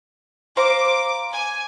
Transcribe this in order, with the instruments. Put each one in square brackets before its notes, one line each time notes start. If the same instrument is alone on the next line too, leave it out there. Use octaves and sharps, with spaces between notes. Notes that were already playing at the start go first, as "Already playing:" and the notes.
[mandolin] C5 F5 A#5 [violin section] D6
[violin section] G#5